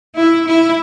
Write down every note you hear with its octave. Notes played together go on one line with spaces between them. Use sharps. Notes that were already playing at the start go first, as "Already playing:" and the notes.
E4
E4